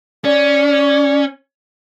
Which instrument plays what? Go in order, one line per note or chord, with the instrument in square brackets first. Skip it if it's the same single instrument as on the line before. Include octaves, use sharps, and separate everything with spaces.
[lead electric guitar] C#4 [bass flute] D5